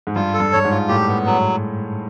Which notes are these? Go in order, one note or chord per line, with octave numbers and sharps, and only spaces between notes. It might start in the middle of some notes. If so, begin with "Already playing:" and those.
G#2
G2 F4
A4
G2
G2 C#5
G#2
F4
A2 G4
B3
F#3